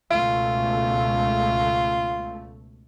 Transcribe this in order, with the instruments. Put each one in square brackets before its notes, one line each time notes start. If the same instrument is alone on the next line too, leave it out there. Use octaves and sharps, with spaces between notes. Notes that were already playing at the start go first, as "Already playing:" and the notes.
[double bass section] C#2 B2 A3 [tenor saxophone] F4